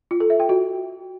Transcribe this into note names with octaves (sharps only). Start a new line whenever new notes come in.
F4
A4
E5
G5
F#4